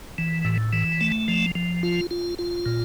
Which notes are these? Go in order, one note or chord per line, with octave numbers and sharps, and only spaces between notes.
E3
A2
E3
A3
F3
F3
F4
F4
F4
A#2